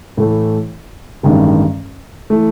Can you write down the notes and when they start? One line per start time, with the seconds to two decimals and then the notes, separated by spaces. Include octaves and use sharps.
0.17 A2 E3 A3
1.23 A1 G2 D#3 G#3
2.30 E3 A3